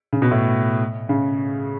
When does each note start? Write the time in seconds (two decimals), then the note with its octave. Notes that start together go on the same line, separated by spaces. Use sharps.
0.13 C#3
0.22 B2
0.31 A2
1.09 C#3